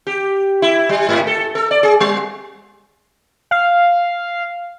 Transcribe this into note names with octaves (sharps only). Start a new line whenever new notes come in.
G4
E4
G3
G#2
A4
A4
D5
G#4
G3
F5